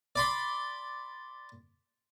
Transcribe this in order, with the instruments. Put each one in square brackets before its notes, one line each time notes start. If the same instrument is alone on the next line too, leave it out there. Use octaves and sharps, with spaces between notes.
[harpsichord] D5 B5 C6